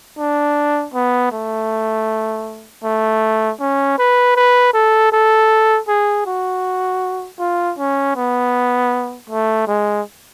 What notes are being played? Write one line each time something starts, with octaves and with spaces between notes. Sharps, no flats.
D4
B3
A3
A3
C#4
B4
B4
A4
A4
G#4
F#4
F4
C#4
B3
A3
G#3